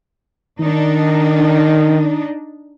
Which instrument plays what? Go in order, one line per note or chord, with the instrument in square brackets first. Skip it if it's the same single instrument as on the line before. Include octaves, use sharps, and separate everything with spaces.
[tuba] D#3 [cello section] D4 D#4